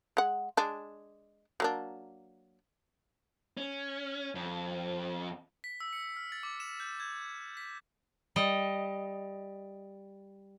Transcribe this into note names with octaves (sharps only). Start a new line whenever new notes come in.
G#3 F#5
G#3 D4
F#3 A#3 D4
C#4
F2
B6
E6
C#7
F6
A6
D6
E7
G6
G#6
B6
G3 D#5